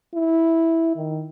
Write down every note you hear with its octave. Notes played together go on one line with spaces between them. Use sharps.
E4
D#3